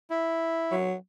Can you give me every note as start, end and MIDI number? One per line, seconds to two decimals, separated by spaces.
0.10 0.76 64
0.71 0.95 54